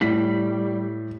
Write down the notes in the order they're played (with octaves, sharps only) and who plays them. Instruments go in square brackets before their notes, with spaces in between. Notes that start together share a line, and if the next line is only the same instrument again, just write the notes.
[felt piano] A2 B6 [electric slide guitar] G3